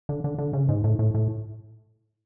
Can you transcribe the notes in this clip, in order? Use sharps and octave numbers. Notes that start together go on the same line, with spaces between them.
D3
D3
D3
C#3
G#2
A2
A2
A2